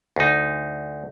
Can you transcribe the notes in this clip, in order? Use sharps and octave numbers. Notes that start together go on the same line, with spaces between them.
D2 D#4